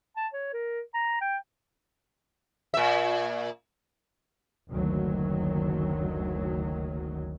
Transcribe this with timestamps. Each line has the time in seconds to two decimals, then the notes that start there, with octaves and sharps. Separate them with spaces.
0.16 A5
0.33 C#5
0.53 A#4
0.94 A#5
1.21 G5
2.74 A#2 E5
4.69 F#1 D2 D#3 F#3